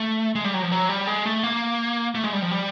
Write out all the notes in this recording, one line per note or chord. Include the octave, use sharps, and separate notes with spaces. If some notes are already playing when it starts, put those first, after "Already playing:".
Already playing: A3
G#3
G3
F#3
F3
F#3
G3
G#3
A3
A#3
A3
G#3
G3
F3
G3